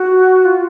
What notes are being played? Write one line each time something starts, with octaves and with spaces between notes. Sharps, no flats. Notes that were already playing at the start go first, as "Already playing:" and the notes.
Already playing: F#4
F4